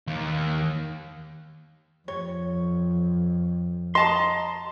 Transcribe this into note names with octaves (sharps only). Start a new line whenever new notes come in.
D#2
F2 C#5
D#5 A5 A#5 C6